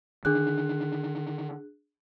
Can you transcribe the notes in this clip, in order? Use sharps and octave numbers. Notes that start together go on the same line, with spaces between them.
D3 D#3 D4 G#4 F#6